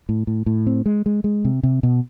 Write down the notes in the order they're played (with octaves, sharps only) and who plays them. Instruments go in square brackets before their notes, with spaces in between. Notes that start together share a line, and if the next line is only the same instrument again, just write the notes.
[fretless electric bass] A2
A2
A2
C4
G#3
G#3
G#3
C3
C3
B2